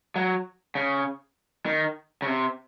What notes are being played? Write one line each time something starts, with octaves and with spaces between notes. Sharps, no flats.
F#3
C#3
D#3
C#3
C3